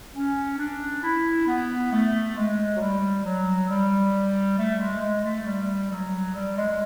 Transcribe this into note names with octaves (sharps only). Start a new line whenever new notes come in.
C#4
D4
E4
B3
A3
G#3
F#3
G3
F#3
G3
A3
G#3
G#3
A3
G3
F#3
G3
G#3
G#3